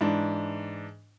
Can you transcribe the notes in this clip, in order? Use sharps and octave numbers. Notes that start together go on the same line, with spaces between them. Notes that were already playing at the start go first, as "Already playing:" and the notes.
G#2 E3 D4